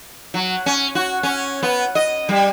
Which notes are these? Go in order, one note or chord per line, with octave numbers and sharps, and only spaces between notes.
F#3
C#4
F#4
C#4
B3
D#5
G3